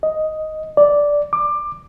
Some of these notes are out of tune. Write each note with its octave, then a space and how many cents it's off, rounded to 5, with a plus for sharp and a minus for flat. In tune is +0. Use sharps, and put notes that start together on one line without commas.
D#5 +5
D5 -5
D6 +20